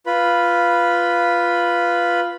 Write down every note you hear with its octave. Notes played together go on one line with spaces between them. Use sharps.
F4 B4 B5